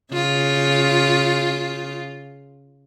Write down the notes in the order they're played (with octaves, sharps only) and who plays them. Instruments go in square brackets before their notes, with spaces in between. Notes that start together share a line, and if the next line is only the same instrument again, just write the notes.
[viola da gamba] C#3 F4